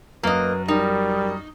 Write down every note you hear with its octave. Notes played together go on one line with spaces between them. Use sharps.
F#2 A#3 B4 D#5
G3 D#4 A#4